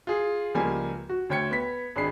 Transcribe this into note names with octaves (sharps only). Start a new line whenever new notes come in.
F4 G#4
C#2 F3 G3 A#3 G#5
F#4
D2 C#5 G5 G#6 C#7
B3 B6
G#1 D4 G#4 B5 C7